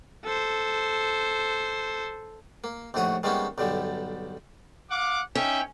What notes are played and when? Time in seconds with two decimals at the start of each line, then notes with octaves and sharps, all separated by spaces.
0.25 A4 C5
2.64 A#3
2.94 A#1 D#2 A2 F#4 F#5 D#6
3.23 D#3 G3 G#3 A#3 B3 C#4
3.58 B1 G2 D3 G3
4.90 F5 F#5 D6
5.35 C#4 D#4 E5 G5